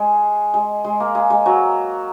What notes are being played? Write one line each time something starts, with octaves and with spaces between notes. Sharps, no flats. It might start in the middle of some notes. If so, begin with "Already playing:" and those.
Already playing: G#3
G#3
G#3
A#3
G#3
G#3
F#3